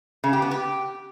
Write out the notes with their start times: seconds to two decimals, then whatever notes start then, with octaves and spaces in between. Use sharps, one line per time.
0.24 C#3
0.33 G4
0.42 B3
0.51 G4